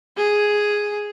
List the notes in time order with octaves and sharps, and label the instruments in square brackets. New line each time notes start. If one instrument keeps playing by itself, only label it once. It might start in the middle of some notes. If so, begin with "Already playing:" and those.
[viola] G#4